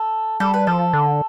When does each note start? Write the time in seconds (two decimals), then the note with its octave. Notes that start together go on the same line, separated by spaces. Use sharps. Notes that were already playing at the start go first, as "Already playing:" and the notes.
Already playing: A4
0.40 G3 A4
0.54 B4
0.67 F3 A4
0.93 D3